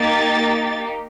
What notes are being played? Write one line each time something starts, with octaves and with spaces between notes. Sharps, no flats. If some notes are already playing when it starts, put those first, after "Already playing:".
Already playing: A#3 D#4 G4 A6